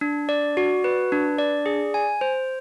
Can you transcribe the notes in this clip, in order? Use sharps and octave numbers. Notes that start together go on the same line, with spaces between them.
D4
D5
F#4
B4
D4
D5
G#4
G#5
C5